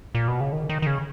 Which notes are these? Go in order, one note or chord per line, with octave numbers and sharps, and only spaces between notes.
A#2
B2
C#3
D#3
D#3
D#3
C#3